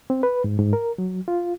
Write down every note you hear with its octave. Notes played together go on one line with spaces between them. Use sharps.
C4
B4
G#2
G#2
A#4
F#3
F4